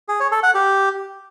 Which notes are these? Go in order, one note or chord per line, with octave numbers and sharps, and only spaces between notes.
G#4
C#5
A4
F#5
G4